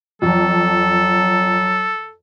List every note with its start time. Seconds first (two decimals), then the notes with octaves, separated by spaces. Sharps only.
0.22 F2 F#3 A4